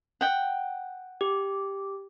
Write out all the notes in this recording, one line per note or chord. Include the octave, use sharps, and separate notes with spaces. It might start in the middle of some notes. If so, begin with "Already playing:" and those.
F#5 G5
G4